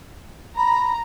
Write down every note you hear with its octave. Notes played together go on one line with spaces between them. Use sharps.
A#5 B5